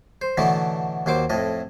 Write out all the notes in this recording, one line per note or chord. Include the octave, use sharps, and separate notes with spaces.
C5
B2 D3 E3 F#3 A3 B3
D#2 F#3 C5 D6
F2 A2 D#5